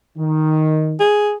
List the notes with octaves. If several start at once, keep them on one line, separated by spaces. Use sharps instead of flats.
D#3
G#4